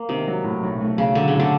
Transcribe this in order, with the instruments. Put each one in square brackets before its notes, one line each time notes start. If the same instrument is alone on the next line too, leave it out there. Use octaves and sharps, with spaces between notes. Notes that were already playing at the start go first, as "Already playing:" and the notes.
Already playing: [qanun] A#3
[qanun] C3 [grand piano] D#3
[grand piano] F#3
A2
B1
A3
[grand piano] B1 [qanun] C#3
[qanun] D3 [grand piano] F#3
[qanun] C#3
[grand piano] A2
[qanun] D3